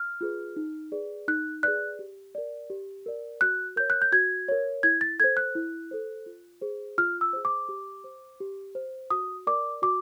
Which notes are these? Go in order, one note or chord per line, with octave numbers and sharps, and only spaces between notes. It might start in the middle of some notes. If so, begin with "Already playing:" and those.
Already playing: F6
F4 G#4 B4
D#4
G#4 B4 D5
D#4 F#6
G#4 B4 D5 F#6
G4
A#4 D5
G4
A#4 D5
F#4 F#6
A#4 C#5 G6
F#6
G6
F#4 G#6
A#4 C#5
E4 G#6
A6
A4 C5 G#6
F#6
E4
A4 C5
F4
G#4 C5
F4 F6
E6
G#4 C5
D6
G4
C5
G4
C5
F#4 D#6
A#4 D5 D6
F#4 D6